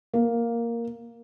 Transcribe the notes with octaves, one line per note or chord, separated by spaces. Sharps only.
A#3